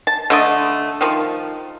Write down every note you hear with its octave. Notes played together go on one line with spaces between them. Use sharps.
A5
D3 A3 D#5
D#3 F3